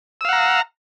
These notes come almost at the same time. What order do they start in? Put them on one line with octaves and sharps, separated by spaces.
E6 F5 F#5 A#5